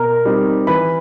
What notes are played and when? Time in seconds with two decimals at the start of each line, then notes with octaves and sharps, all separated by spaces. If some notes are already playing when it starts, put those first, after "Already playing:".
Already playing: B2 A#4 A#5
0.25 G3 C4 D#4
0.67 E3 B4 B5